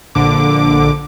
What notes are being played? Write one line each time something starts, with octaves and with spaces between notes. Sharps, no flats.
A#1 D3 D6